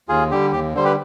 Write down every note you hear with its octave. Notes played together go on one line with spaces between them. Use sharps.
D#2 F4 G#4
D3 G3 G4
D#2 G4
D3 G3 C5
G4 B4